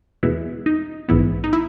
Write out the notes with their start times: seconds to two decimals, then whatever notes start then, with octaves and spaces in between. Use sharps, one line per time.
0.23 E2 B2 G#3 B3 E4
0.66 D#4
1.08 A#1 G#2 E3 B3 E4
1.44 D#4
1.53 E4